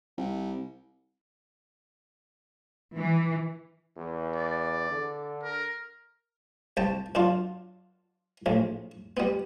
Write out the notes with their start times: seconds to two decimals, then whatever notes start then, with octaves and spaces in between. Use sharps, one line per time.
0.18 C2
2.97 E3
3.97 E2
4.36 D5
4.91 D3
5.43 A#4
6.77 C2 G5 A5
7.15 F#2 D4 F4
8.46 A#1 A2
9.17 G3 B3